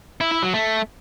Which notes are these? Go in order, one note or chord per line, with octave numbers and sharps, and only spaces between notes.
E4
E4
F#3
A3